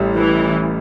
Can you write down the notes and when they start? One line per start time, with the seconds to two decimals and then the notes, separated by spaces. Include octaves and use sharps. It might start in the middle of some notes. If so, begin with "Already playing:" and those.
Already playing: A1 A2 G3
0.15 E3